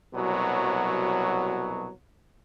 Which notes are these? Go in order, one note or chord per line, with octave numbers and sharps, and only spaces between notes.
C2 B2 F#3